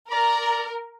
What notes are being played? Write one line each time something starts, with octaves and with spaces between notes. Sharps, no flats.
A#4 D5 A#5